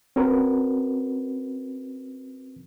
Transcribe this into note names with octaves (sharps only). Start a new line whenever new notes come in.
C4 C#4 F#4 A#4 B4